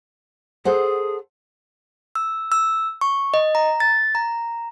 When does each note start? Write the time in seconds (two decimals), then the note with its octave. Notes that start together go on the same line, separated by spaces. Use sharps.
0.65 G#4 A4 C5 F#5
2.15 E6
2.52 E6
3.01 C#6
3.34 D#5
3.55 A#5
3.80 A6
4.15 A#5